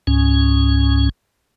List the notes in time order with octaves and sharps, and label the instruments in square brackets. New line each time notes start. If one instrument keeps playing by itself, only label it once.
[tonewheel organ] C#2 G#2 C#4